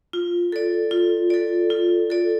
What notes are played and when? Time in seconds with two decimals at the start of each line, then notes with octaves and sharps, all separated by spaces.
0.13 F4
0.52 A4 D5
0.91 F4
1.30 A4 D5
1.70 F4
2.10 A4 D5